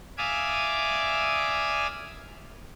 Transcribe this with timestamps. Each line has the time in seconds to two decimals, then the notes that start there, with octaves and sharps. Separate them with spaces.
0.18 D5 E5 F5 G#5 D6 D#6